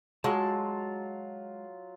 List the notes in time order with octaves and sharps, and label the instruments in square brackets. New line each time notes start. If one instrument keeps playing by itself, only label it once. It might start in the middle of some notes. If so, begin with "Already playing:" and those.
[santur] F#3 F4 [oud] G#3 [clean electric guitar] A5